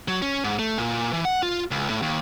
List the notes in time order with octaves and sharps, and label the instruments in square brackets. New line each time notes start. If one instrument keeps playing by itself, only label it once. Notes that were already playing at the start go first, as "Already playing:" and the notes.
[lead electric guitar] F#3
C#4
G#2
A3
A#2
E3
F#5
F4
C#2
A2
D#2